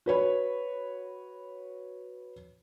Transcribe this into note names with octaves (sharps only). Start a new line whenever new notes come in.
F#4 B4 C#5 B5